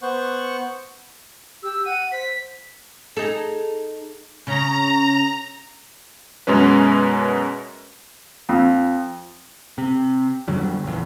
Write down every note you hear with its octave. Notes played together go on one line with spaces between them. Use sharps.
B3 C5 F#5 C#6
G4 E6
F#5 D#7
C5 B6
D#4 G#4 A4
C#3 C#4 A#5
F#2 B2 G#3 C#4 B4
F2
C3
F2 D3 F#3 G3
A#1 E2